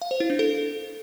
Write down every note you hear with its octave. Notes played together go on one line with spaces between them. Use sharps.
F5
C5
E4
D4
A4